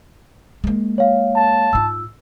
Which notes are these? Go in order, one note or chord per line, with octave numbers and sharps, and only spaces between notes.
G#3 A#3
C#5 F5
A5
G#2 F4 E6